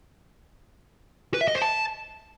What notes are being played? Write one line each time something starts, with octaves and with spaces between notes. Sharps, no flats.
B4
E5
D#5
C5
A5